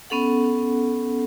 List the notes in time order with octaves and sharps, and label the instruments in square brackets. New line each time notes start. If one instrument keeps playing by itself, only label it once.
[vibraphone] B3 C#4 A4 F#5